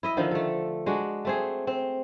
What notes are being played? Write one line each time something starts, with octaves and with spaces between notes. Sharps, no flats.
E4 D#5 E5
D3 D#3 F3
A3 A4
G#3 D4 F#4
A3 C4 G#4
C4